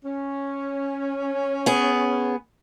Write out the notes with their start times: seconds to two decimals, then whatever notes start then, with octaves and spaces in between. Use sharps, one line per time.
0.05 C#4
1.66 B3 G#4